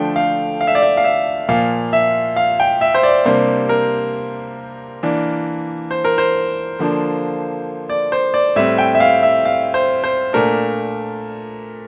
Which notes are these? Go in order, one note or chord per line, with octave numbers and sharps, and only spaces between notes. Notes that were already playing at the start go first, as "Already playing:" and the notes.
Already playing: D3 F3 A3 D4 G5
F5
F5
E5
D5
E5
F5
E5
A#2 F3 A#3 F5
E5
F5
G5
E5
C5
D5
C3 G3 A#3 D4 C5
A#4
E3 A#3 D4
C5
A#4
C5
D3 F3 A#3 D4
D5
C5
D5
A2 G3 C4 E5
G5
E5
F5
E5
F5
C5
C5
A#2 A3 D4 A#4